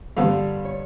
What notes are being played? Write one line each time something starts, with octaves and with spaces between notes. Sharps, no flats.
G2 D3 G3 B3 F5
C#5